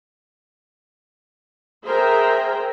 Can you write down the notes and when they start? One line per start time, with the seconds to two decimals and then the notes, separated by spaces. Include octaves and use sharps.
1.85 G#4 A#4 C5 E5 G5 A#5